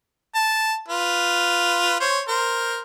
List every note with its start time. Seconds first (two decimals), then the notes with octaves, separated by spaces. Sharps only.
0.35 A5
0.88 F4 B4
2.00 C5 C#5
2.28 A#4 C5